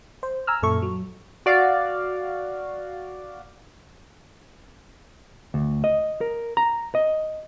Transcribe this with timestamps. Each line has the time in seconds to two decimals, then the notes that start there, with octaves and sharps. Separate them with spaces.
0.23 C5
0.47 G#5 A#5 E6 F6
0.63 F#2 A#2 A4 E5 C#6
0.82 F#3
1.46 F#4 D5 F5
5.54 D2
5.84 D#5
6.21 A#4
6.57 A#5
6.95 D#5